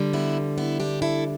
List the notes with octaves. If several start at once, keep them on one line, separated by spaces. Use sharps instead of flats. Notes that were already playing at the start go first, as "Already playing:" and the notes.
Already playing: D3 G3
B3 E4
B3 E4
D4 G4
E4 A4